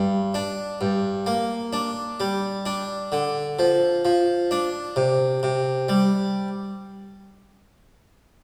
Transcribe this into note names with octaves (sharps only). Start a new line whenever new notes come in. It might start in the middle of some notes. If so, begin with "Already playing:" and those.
Already playing: G2
D4
G2
A#3
D4
G3
D4
D3
F3
F3
D4
C3
C3
G3